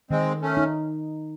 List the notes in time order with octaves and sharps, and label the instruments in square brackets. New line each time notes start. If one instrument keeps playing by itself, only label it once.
[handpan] D#3 [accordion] G#3 C4
[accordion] A3 C#4
[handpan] D#4